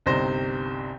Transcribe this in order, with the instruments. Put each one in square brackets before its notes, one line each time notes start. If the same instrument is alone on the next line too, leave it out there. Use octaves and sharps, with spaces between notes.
[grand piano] G1 C2 C3 D#4 C5 A#6